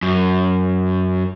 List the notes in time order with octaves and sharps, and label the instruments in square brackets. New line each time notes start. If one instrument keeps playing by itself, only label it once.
[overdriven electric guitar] F#2